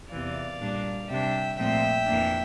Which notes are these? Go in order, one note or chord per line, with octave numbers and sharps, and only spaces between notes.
E2 C3 E3 D5 F5
A#2 G3 A#3 D4
C3 G3 D4 E5 G5
A#2 F3 A3 C4 E5 G5
F2 E3 A#3 D4